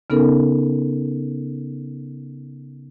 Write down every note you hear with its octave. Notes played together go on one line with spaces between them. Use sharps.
C#3 B3 C#4 D#4 A4 A#4